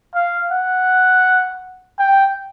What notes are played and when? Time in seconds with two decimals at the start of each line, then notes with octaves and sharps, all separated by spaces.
0.15 F5
0.52 F#5
1.99 G5